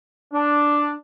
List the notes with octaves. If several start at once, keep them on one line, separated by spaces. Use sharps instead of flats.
D4